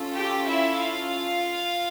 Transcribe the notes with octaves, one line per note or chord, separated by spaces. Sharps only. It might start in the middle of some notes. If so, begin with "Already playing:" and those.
Already playing: C#4 F4 A4
G4 G5
E4 E5
F4 F5